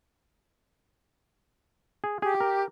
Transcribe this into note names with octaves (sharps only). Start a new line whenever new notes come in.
G#4
G4 G#4
A#4